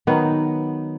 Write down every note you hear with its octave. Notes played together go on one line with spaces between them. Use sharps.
D#3 F#3 B3 D#4